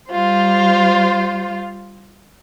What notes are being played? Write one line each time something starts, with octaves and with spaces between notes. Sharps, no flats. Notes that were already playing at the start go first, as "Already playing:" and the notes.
G3 F4 C5